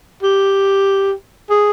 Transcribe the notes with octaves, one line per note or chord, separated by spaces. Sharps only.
G4
G#4